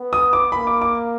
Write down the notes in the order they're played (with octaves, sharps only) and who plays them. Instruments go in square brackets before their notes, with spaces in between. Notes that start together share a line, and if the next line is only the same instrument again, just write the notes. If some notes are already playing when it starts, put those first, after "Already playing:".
Already playing: [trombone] B3
[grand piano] D#6
D6
[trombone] A#3 [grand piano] B5
[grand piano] D6
D6